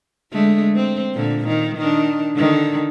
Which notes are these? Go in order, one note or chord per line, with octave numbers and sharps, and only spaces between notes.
D3 G#3 A3
C4
A#2 D3
D#3
D#3 D4
D3 D#3